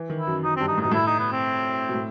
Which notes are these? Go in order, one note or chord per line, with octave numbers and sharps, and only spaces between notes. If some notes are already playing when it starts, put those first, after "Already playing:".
Already playing: E3
D#3
E4
F#2
F#2 D#4
G2 C4
D#4
A2
B2 D#4
A2 E4
D#4
B3
C4
B2
A2